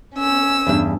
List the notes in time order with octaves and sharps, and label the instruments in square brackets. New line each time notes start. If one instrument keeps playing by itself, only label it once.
[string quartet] C#4 E6
[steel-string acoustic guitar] E2 G2